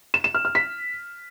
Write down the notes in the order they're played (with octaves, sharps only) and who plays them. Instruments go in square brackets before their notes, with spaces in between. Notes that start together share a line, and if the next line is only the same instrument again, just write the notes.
[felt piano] E7
E7
F6
F6
B6